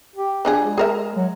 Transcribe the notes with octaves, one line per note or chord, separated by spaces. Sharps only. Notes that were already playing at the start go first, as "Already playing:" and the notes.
G4
F3 D4 G#4
G#3
G#4 A#4 E5
F#3